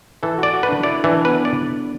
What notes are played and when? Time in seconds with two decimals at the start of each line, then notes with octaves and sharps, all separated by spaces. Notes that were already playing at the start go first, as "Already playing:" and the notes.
0.23 E3 A4
0.38 F#4 D5
0.54 F#4
0.63 B4
0.69 D4
0.83 E4 D5
1.04 E3 D4
1.25 B3 B4
1.45 D5